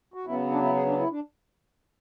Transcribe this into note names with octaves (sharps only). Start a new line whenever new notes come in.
F#4
C#3 F#3 B3 E4
D4
E4
G#4
D4
E4
D4